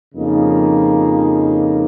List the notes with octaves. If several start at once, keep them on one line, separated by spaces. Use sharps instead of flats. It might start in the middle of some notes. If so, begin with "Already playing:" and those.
F2 C#3 F3 A#3 D#4